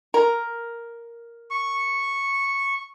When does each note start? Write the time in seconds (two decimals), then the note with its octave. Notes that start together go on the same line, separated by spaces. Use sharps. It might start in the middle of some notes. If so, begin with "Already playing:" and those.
0.14 A#4
1.51 C#6